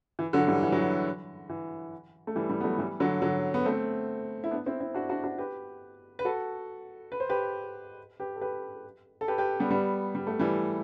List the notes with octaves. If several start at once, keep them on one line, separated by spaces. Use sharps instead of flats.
E3
D3 F#3
E3 G3
E3
F#3
E3
E3
A3
E3 G3
E3 G3
B3
F#3 A3
E3 G3
D3 F#3
D3 F#3
B3
A3 C4
E4
B3 D4
C4 E4
C4 E4
D4 F#4
D4 F#4
D4 F#4
G4 B4
B4
F#4 A4
B4
C5
G4 B4
G4 B4
A4
G4 B4
A4
G4 B4
G4 B4
G3 B3
G3 B3
G3
A3
E3 G3